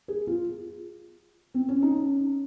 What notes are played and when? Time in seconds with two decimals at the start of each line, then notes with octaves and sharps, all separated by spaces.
0.08 G#4
0.27 F4
1.54 C4
1.69 C#4
1.82 D#4
1.96 C#4